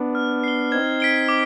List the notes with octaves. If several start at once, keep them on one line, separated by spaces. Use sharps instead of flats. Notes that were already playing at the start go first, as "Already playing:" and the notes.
Already playing: B3 D4
F6
C7 G7
C4 D#4 G#6
B6 D7 G7
D6